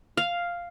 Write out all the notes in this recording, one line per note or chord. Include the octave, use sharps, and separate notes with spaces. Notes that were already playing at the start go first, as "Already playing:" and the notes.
F5